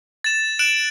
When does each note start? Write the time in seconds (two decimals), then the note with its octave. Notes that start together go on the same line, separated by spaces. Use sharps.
0.24 A6 E7
0.59 F#6 D7 E7 F#7